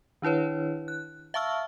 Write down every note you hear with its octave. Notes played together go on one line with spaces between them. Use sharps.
D#3 D4 E4 B4 C#5
F#6
E5 F5 A5 C#6 E6 F6